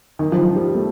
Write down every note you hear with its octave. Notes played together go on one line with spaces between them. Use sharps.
D#3
F3
F3
G3
A3